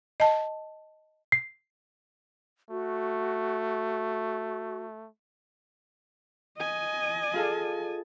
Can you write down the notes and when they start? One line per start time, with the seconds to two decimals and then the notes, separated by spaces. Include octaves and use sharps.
0.20 D#5 A5
1.32 C7
2.70 A3 F#4
6.58 D#5 G#5
7.34 F4 G#4 A4